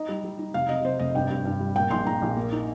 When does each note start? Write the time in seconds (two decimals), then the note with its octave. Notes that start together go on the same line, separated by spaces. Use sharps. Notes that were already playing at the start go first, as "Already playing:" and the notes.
Already playing: D#4 D#5
0.09 G3
0.24 G3
0.39 D#4
0.54 F1 F5
0.69 C3 D#5
0.85 C3 C5
0.99 F1 D#5
1.15 G2 G5
1.30 G2
1.45 G2
1.61 G3
1.76 A#2 G5
1.91 A#1 C6
2.06 A#1 A#5
2.22 A#1
2.37 A#3
2.52 D#4